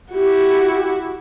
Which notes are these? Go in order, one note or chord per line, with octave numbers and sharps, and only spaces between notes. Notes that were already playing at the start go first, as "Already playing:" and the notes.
E4 F#4 G4